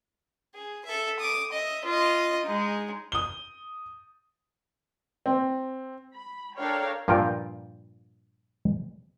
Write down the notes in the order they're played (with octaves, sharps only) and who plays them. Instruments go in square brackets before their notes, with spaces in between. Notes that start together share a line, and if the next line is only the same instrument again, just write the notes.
[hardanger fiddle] G#4
A4 E5
D6 D#6
D#5 E5
F4 D#5
G#3 D#4
[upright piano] D#6 G7
C4
[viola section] B5
D4 A4 A#4 C#5 F5 G5
[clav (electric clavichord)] G2 A#2 F3 F4 A#4 G5